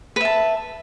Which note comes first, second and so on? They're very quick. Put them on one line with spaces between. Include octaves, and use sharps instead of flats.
B4 E5 A5